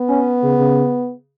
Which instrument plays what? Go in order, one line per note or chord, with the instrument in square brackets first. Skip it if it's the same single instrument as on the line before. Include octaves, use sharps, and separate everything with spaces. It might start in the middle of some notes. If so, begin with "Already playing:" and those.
Already playing: [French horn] B3
[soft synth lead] C#4
C#3
C#3